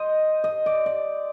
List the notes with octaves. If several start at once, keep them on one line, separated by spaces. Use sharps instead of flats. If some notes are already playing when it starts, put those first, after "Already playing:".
Already playing: C5 D#5
D#5
D5
D5